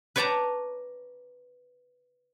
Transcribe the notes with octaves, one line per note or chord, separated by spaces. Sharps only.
B4 C#5 D5 G5 A5 A#5